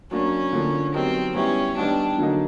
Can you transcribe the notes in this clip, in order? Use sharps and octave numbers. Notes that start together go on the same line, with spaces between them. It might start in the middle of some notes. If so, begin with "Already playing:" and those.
F#3 A#3 C#4 D4
D3 F3 A#3 D4
F#3 B3 C4 D#4 G4 A#4
G3 B3 C#4 E4 G4
D#3 G3 B3 D4 D#4 G4
D3 F#3 A#3 D#4